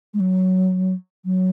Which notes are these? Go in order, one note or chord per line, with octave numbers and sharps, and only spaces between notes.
G#3
F#3
F#3